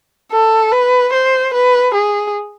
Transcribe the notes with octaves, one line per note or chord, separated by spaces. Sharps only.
A4
B4
C5
B4
G#4